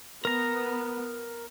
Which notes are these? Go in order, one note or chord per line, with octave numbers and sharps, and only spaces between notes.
B3 A#4 A#5